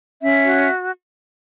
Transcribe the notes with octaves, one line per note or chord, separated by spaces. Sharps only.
C#4 E5
F#4